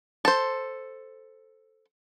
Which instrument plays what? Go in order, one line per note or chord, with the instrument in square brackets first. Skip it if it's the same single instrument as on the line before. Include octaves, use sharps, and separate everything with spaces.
[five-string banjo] A4 C5